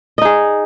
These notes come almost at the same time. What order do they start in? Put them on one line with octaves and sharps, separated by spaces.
D#5 D#4 G#4